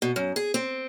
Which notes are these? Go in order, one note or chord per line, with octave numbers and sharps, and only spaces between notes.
B2
F#2
G#4
C4